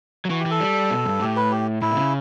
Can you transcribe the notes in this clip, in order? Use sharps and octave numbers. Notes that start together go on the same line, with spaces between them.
F#3
E3 F#4
G4
E3
A4
G3
B2
G2
A2 G4
B4
G4
A2 E4
B2
C#3